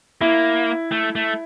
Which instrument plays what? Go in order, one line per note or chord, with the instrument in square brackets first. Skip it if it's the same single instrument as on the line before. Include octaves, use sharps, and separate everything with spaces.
[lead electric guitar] A#3 [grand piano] E4
[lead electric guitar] A3
A3